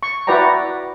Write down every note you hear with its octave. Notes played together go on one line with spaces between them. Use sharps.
C#6
E4 F#4 B4 D5 G5 A#5